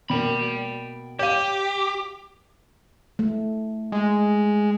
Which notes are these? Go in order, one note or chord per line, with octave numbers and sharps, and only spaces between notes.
B2 A#3 G5 B5
G4 C#5 F5 D#7 E7
A3
G#3